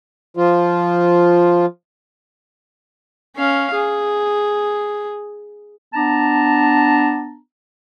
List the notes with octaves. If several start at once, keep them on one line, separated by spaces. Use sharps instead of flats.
F3 F4
C#4 F5
G#4
B3 D4 A5 A#5